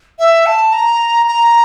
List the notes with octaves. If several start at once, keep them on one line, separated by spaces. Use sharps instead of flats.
E5
A5
A#5
A#5